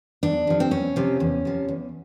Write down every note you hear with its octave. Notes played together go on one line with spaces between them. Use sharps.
E2 D4
C3 F3
C4
E2 C#4
C3 F3
E2
C3 F3
E2